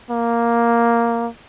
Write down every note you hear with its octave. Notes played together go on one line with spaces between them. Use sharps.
A#3